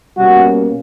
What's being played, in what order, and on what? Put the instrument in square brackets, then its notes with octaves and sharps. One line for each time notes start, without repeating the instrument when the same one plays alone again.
[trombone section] B2 G3 A#3 C#4 [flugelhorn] F#4